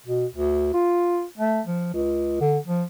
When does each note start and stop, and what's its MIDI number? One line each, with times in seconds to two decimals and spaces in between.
0.06 0.26 47
0.35 0.71 38
0.74 1.24 65
1.38 1.61 57
1.66 1.89 53
1.94 2.36 37
2.40 2.58 50
2.67 2.83 53